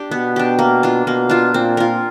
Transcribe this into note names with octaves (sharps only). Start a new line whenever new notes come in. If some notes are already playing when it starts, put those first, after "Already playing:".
Already playing: D4 G4
B2 B3
D4 G4
A#3
D4 F4
B2 A#3
D4 F4
A#2 C4
F4 A#4